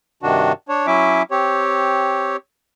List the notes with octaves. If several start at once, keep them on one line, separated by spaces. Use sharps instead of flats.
G2 C3 D#3 D4 F#4
D4 C#5
F#3 C#4 E4 E5 D6
C4 G4 C#5